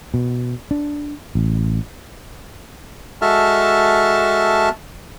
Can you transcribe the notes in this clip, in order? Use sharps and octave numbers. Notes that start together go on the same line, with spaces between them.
B2
D4
A1
G#3 F#4 A4 E5 A5 F6